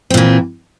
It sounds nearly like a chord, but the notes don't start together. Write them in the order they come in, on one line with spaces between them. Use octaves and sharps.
C4 A#2 E3